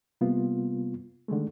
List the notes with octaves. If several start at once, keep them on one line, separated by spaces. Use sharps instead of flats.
C3 G3 A#3 B3 F4
D3 D#3 G#3 A3